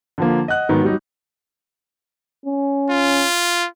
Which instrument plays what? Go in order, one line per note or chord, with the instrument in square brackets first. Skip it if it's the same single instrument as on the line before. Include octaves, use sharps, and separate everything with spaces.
[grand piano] D3 F3 A#3
D#5 F#5 F#6
G#2 D#3 F#3 B3
F#3 G3 D#4
[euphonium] C#4
[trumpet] F4